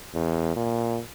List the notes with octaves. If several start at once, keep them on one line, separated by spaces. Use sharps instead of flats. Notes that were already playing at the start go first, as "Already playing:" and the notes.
E2
A#2